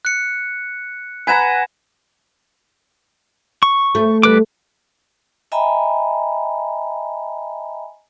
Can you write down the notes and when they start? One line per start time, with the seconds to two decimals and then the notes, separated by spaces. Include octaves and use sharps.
0.05 F#6 C#7
1.27 B4 F#5 G#5 A#5 G#6 E7
3.63 C#6
3.95 A3
4.23 G3 B4 D6
5.52 D#5 E5 G5 G#5 A#5 B5